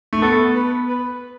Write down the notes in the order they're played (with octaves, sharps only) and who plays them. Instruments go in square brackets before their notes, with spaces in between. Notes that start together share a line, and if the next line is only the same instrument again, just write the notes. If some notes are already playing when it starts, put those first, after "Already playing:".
[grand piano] A3
[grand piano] B3 [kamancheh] A4
[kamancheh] B4
B4